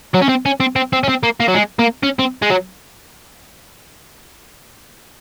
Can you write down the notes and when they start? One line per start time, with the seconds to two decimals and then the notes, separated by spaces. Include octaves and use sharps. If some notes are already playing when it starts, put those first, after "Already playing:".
0.14 F#3
0.22 C#4
0.29 C4
0.46 C#4
0.60 C4
0.76 C4
0.93 C4
1.04 C#4
1.09 C4
1.23 A#3
1.40 A#3
1.48 F#3
1.55 G#3
1.79 A#3
2.03 C#4
2.19 C4
2.42 G#3
2.50 F#3